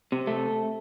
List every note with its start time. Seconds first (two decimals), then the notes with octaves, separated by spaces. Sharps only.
0.12 C3
0.27 A3